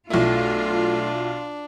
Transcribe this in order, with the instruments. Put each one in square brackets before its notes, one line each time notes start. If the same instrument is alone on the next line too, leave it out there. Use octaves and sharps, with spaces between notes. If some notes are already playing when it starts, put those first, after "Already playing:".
[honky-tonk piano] B1 E4 [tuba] A3 [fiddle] D4 [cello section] F4